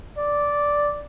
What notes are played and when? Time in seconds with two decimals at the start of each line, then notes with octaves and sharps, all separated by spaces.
0.17 D5